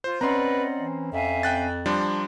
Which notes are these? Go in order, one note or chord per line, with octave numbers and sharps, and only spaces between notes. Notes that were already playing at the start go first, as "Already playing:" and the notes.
F4 C5
C4 C#4 B4 D5 D#5 F#5 A#5 C6
E3
F2 E5 F5 G#5
G5 F#6 A6
F3 G3 D4 A#5 C6